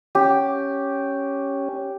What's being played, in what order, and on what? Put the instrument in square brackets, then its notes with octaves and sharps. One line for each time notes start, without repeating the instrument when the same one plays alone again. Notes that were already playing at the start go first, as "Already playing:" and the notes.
[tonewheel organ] C#4 [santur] G4